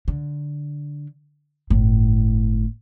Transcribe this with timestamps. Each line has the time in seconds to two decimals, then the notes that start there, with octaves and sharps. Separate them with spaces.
0.08 D3
1.70 G1 A2